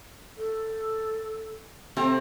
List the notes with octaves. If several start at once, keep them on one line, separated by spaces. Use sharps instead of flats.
A4
C3 A3 C4 A#5